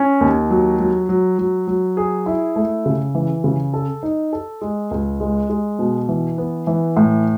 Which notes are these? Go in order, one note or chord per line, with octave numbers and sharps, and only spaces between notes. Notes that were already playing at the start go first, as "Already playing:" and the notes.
Already playing: C#4
D#2
F#3
F#3
F#3
F#3
F#3
G#4
E4
A3
C#3
E3
C#3
A4
D#4
A4
G#3
C#2
G#3
G#3
B2
E3
B3
E3
A2